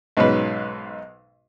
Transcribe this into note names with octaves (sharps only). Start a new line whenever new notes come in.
B1 G#2 B2 G#3 C#4 B4